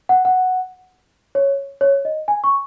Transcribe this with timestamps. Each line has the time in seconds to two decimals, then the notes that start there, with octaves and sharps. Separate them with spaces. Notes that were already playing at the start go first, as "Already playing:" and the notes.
0.09 F#5
0.25 F#5
1.35 C#5
1.81 C#5
2.05 D#5
2.28 G#5
2.44 C#6